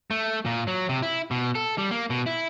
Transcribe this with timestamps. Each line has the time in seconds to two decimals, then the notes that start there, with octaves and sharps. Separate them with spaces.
0.11 A3
0.45 A#2
0.67 F#3
0.89 C3
1.02 E4
1.31 B2
1.55 A4
1.78 G3
1.91 A#3
2.10 B2
2.26 E4